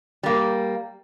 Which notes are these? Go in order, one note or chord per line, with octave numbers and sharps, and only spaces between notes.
G3 A#3